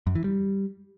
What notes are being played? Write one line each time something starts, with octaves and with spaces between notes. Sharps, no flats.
F#2
E3
G3